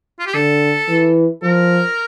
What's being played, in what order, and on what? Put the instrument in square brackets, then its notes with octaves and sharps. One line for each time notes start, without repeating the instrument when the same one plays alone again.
[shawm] F4
G4
[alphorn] D3 [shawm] A4
[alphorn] E3
[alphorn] F3 [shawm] A#4